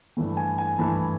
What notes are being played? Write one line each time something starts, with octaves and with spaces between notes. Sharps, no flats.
G2 E3 A3
A5
G#5
G#5
G2 E3 A3 A5